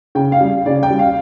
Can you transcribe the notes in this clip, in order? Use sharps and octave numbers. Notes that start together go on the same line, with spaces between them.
C#3 G5
F5
G3
C#3 D5
G5
G3
F5